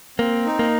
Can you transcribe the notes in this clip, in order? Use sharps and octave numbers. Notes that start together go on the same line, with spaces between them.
A#3 C4
D#4
A#3